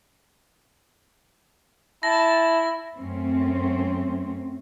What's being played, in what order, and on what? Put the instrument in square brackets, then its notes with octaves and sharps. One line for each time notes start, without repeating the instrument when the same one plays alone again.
[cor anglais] E4 [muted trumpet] A5 [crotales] A#6
[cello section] F#2 A3 C4 C#4